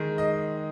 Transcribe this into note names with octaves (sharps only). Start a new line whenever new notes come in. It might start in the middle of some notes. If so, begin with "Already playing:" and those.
Already playing: D#3 G#3
D#5